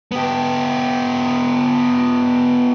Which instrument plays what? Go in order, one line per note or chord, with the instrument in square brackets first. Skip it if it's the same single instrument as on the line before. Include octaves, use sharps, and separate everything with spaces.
[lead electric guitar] B3 G4